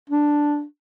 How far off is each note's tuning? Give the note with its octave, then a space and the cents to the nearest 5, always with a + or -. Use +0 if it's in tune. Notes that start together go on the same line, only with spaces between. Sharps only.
D4 +0